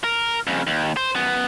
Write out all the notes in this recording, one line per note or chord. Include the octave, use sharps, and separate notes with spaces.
A#4
F2 C#3
D#2
C5
F#2 B3